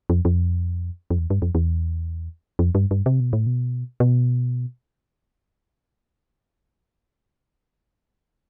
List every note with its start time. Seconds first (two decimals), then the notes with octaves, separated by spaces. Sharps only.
0.10 F2
0.25 F2
1.11 F2
1.18 E2
1.30 G2
1.42 F2
1.55 E2
2.59 F2
2.75 G2
2.91 G2
3.06 C3
3.20 B2
3.33 A2
3.47 B2
4.00 B2